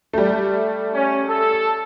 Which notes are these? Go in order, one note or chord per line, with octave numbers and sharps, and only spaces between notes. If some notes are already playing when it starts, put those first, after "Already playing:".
G3 A3
C#4
A4